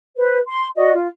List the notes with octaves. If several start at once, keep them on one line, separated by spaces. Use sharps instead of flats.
B4 C5
C6
F#4 D5 D#5
F4